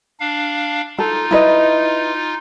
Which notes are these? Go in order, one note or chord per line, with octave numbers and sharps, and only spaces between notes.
D4 F5
D#4 F4 A4
E4 B4 D#5